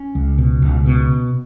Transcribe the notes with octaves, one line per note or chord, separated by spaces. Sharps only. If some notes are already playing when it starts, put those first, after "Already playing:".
Already playing: C#4
C#2
B2
C#2
B2